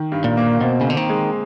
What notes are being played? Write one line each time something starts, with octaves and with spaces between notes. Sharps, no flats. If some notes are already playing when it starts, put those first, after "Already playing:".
Already playing: D#3
G2
A#2
A#3
B2 C4
C#3
D3 C4
D#3
G#3